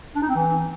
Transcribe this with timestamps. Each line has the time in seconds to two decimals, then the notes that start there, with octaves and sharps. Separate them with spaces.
0.15 D4
0.22 D#4
0.29 C4
0.35 E3